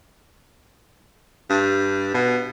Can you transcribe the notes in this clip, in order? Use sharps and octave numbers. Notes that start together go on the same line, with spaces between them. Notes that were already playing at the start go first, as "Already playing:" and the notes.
G2
B2